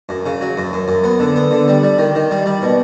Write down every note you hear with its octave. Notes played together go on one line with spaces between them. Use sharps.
F#2
C#3
F#3
F#2
F#2
F#2
B3
D3
B3
D3
G3
G3
D#3
D#3
G3
G3
B2